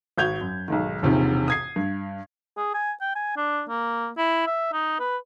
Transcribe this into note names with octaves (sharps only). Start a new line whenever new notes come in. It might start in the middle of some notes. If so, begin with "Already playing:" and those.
G#1 F#4 G6 G#6 F7
F#2
B1 G#2 D#3
E1 A#1 C3 D#3
D#6 G#6 C7
G2
G#4
G#5
G5
G#5
D4
A#3
E4
E5
D#4
B4